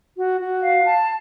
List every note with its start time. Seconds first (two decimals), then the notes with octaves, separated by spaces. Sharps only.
0.17 F#4
0.39 F#4
0.62 F5
0.84 A5